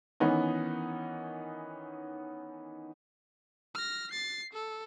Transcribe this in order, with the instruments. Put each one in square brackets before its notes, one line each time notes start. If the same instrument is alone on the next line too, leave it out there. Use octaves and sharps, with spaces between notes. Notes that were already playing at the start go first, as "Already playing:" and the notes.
[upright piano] D#3 E3 B3 C#4 D#4
[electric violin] F6 A#6
A6 C7
A4